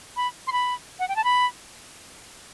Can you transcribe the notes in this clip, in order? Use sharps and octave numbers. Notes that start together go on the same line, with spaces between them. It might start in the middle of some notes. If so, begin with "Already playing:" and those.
B5
C6
B5
F#5
G5
A5
B5